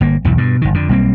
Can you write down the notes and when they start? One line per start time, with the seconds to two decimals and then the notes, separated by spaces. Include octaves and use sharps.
0.01 G1 A#3
0.25 B1 E2 G2 E3
0.38 G2 B2
0.62 G1 D#3
0.74 F2 D3
0.89 B1 G3 A#3 C4